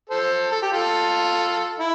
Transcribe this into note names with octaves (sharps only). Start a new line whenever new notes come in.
A4 C5
A4
G4
F4 A4
E4